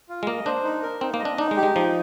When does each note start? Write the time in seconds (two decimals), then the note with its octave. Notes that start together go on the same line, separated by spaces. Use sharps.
0.09 F4
0.23 G#3
0.27 A#3 D#5
0.46 D4 C5
0.64 D#4
0.82 A#4
1.01 C4 D#4
1.14 A#3
1.19 D#5
1.25 D4
1.38 D4 D#4
1.51 G#3
1.56 G4
1.63 G#3
1.75 F3 D#4